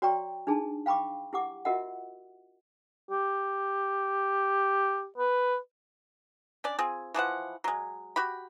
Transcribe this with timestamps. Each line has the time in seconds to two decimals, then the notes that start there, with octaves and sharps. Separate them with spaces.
0.02 F#4 C#5 D5 G5 A#5 C#6
0.47 D4 D#4 G#4 A5
0.86 F5 G5 B5 C#6 D6
1.33 E4 G4 F#5 D6
1.65 F4 F#4 A#4 D#5 E5 F#5
3.11 G4
5.18 B4
6.64 C#4 D4 D5
6.79 C4 F4 G#4
7.14 E3 F3 C5 F#5
7.64 F#3 G#3
8.16 F#4 G4 B5